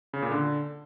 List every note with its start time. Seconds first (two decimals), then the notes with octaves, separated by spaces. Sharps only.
0.13 C#3
0.22 A#2
0.31 D3